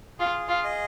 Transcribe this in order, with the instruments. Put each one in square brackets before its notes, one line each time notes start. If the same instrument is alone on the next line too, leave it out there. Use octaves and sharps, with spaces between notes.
[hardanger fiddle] F4 [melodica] G#4
[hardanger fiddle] F4
[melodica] D#5